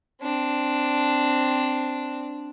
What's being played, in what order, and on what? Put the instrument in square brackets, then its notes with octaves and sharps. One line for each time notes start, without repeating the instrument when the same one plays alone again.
[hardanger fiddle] C4 D4